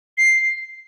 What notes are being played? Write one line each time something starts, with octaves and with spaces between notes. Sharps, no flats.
C7